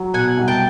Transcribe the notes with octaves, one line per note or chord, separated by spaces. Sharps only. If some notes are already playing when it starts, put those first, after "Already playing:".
Already playing: F#3
B2 F#5 G#5
C2
G5 A5